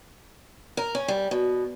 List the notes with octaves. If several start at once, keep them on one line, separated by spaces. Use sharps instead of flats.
A#4
C#4
G3
B2